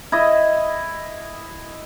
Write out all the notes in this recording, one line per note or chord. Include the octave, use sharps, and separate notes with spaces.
E4 D#5